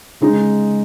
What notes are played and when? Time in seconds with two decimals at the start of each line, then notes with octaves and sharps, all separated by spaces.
0.21 C#3 G#3 D#4